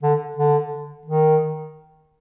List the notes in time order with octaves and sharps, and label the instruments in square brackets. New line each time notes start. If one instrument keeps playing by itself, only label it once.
[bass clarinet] D3
D3
D#3